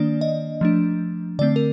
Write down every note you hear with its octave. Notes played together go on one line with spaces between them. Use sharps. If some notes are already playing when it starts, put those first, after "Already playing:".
Already playing: D#3 A#3 D4 D5
D#5
F3 A3 D4
D3 A3 C4 D5
A#4